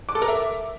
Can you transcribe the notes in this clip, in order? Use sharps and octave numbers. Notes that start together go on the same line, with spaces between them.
D6
A4
A#4
E5